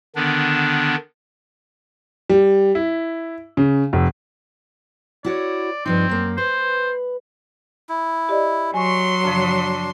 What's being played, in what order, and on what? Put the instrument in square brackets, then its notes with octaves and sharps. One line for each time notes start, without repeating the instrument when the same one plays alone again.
[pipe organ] D3 D#3 B3 D4
[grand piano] G3
E4
C#3
F1
[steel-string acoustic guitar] E4 F#4 C#5 [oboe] D5
[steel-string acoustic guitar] G2 F3 D#4 [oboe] C4
[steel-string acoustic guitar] F#2 A#3
[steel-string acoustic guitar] B4 [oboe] C5
[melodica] E4
[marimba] G4 D5 D#5
[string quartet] F#3 C6 [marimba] G#5 C#6
[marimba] F#2 C#3 F3 [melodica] D4